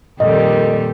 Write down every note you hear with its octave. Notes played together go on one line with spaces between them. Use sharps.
F2 A#2 D#3 G3 G4 A4 D#5